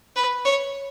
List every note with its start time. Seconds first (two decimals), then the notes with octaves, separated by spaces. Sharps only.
0.16 B4
0.45 C#5